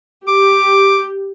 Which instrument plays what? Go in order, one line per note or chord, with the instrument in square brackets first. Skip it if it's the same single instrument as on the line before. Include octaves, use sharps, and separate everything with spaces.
[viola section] G4 [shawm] D6